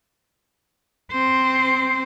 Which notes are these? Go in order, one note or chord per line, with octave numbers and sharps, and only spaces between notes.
C4 C5